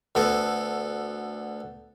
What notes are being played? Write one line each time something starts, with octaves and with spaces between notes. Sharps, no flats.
D2 B3 A4